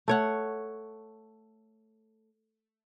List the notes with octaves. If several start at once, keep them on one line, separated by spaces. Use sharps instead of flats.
A3 C#5 F#5